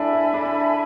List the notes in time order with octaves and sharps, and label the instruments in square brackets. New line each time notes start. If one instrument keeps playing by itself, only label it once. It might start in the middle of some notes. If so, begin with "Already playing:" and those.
Already playing: [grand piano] D4 E4 [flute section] A4 E5 G#5 B5
[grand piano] E4
D4